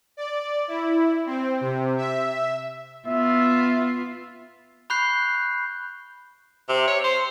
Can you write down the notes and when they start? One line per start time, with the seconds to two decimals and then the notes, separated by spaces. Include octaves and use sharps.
0.17 D5
0.68 E4
1.26 C4
1.61 C3
1.97 E5
3.07 B3 F4 E5
4.90 B5 C#6 F#6 G6 C7
6.69 C3
6.87 C#5
7.04 C5